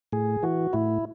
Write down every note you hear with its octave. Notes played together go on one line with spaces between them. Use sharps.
A2 G#4
E3 F#4
A2 E4